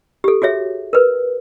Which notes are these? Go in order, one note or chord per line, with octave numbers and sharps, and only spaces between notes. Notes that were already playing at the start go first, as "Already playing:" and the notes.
G4 A4
F#4 G#4 C#5 E5
A#4 B4